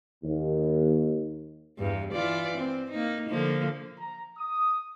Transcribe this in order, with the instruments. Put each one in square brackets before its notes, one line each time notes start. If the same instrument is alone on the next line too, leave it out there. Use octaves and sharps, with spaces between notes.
[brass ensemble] D#2
[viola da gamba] E2 G2
E3 F4 D5
C4
A#3 D#4
D3 F3 A#3
[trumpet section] A#5
D#6